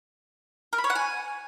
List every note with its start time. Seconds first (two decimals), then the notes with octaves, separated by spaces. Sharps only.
0.73 A#4
0.78 B5
0.84 C#5
0.90 F#5
0.95 G#5